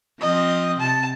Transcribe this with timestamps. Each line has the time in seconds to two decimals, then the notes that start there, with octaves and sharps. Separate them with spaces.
0.21 F3 C4 D#5
0.80 C3 A5